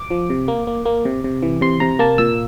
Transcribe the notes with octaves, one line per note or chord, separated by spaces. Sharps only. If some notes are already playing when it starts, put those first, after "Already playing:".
Already playing: D6
F3
C3
A#3
A#3
A#3
C3
C3
E3
C3 C6
C3 A#5
A#3 A5
A#2 E6